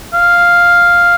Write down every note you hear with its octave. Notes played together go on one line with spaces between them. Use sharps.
F5